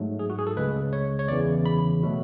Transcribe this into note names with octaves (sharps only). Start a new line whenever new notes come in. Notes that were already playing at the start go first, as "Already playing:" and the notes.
Already playing: G#2 F#3 A3
G#4
F#4
G#4
A4
C#2 C#3 G#3 B4
C#5
C#5
E2 C#3 E3 D5
B5
B2 F#3 A3